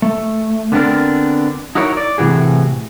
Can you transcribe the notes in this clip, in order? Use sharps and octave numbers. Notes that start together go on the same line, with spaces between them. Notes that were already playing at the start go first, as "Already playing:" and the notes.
A3
D3 B3 C4 D4 A#4
D#4 E4 F#4 A#4 C#5
D5
A2 C3 E3 F#4 G#4